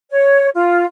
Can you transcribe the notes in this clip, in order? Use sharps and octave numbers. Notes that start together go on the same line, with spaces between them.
C#5
F4